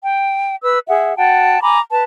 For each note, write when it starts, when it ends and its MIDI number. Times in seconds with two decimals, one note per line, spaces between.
0.03 0.56 79
0.63 0.79 71
0.63 0.79 88
0.88 1.17 68
0.88 1.17 76
0.88 1.17 78
1.17 1.58 66
1.17 1.58 78
1.17 1.58 79
1.17 1.58 81
1.61 1.79 80
1.61 1.79 82
1.61 1.79 83
1.61 1.79 86
1.90 2.03 71
1.90 2.03 81